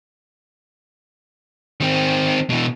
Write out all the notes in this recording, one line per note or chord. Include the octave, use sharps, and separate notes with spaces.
D#3 C4
B2 E3